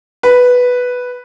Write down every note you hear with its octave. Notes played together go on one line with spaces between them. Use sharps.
B4